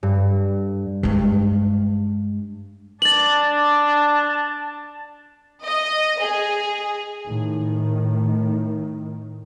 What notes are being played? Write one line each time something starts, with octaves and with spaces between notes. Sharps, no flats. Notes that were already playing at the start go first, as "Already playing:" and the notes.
G2
G2 G#3
D4 A5 A6 F#7
D#5
G#4
A2 D#3